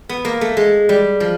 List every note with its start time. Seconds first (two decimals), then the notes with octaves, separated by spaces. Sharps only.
0.09 B3
0.25 A#3
0.41 A3
0.57 G#3
0.89 G3
1.20 F3